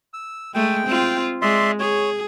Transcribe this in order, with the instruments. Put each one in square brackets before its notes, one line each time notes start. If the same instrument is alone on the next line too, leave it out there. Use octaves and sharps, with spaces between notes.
[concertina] E6
[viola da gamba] G#3 A3 [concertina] G5
[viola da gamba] C4 F4
[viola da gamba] G#3 [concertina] D5 E5 C6
[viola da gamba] G#4 [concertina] C#5